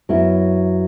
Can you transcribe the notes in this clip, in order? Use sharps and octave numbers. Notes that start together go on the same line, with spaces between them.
F#2 F#3 B3 E4